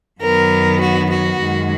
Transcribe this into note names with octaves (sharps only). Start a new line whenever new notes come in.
F#2 D#3 F#3 B3 A#4
F#4
F#4
F#2 D#3 G#3